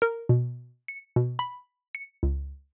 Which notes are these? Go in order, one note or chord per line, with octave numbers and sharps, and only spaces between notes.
A#4
B2
C#7
B2
B5
C#7
C#2